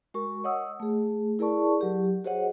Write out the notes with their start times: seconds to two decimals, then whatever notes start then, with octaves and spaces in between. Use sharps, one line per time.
0.14 G#3 F#4 A#4 C#6
0.44 C#5 D#5 F#5 D#6 E6
0.80 A3 G#4
1.39 E4 G#4 A#4 D5 A5 C#6
1.81 F#3 G4
2.24 F#4 G#4 C5 C#5 D#5 F#5